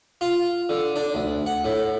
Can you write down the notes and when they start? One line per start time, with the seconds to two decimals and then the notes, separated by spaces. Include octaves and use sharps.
0.21 F4
0.69 D3
0.96 D4
1.14 D2
1.46 F#5
1.65 A2